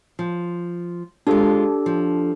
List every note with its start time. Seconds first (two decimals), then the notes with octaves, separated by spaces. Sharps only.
0.19 F3
1.27 G#3 D4 F4 G4 A4
1.86 F3